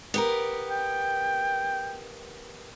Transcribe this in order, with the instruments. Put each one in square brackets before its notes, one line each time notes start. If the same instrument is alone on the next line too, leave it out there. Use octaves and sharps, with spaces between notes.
[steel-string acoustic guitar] B3 G4 A#4
[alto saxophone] G5